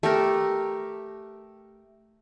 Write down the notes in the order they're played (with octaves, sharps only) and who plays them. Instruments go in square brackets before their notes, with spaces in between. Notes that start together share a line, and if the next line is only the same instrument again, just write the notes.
[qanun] A3 G4 A#4